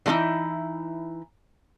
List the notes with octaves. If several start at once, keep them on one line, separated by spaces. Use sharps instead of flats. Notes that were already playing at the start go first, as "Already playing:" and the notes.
E3 F#3 A3 D#4 E4